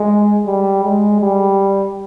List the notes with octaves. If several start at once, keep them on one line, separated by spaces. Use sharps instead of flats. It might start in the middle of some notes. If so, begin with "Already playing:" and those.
Already playing: G#3
G3
G#3
G3